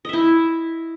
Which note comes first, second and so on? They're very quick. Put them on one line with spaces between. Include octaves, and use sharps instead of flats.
D#5 E5 E4